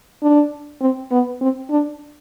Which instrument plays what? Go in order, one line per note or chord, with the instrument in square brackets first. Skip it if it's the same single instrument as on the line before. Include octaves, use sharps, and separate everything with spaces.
[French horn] D4
C4
B3
C4
D4